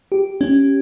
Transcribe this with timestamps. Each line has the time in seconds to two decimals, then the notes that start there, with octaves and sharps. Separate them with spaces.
0.12 G4
0.41 C#4